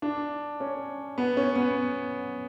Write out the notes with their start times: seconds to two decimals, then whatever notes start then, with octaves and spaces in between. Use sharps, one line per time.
0.02 D4
0.60 C#4
1.18 B3
1.37 C#4
1.55 B3